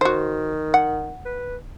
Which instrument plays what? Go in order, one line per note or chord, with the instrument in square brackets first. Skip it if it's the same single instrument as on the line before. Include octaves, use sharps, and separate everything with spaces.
[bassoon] D#3 [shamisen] F#4 C5
[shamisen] F#5
[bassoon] B4